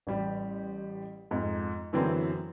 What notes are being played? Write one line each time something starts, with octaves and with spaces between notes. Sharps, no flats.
A1 G3 G4
F2 G#2
F#2 D3 E3 F#3 B3 C4